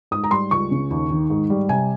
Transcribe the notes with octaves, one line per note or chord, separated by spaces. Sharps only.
G#2 D#6
A#5
G3 C6
C#2 C#6
C#3
D#2
D#3
G#2
G3
C3 G#5